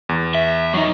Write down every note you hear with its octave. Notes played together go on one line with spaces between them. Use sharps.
E2
E5
F#3 D#4